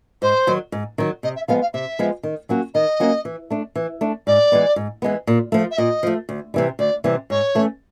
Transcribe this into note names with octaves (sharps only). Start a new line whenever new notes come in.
G#2 C5
D#3 F#3
G#2
D#3 F#3
C3 D#5
E5
F3 G#3 B3 F5
F5
C3 E5
F3 G#3 B3
D#3
F#3 A#3 C#4 F#4
D#3 D#5
F#3 A#3 C#4 F#4
E3
A3 D4
E3
A3 D4
G#2 D5
E3 G#3 B3
G#2
E3 G#3 B3
A#2
F3 A3
E5
A#2 D#5
F3 A3
D2
C3 E3 G3
D2 D5
C3 E3 G3
G#2 C#5
E3 A3 C#4